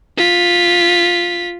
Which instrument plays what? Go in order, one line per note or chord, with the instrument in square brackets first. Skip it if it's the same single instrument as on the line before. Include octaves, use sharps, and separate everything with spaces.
[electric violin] F4 B6